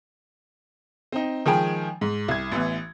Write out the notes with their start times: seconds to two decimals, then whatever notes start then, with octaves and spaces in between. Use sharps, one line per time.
1.12 C4 D#4
1.46 D#3 F3 G#3 G5 G#5
2.01 G#2
2.28 C2 G#6
2.52 A1 E3 B3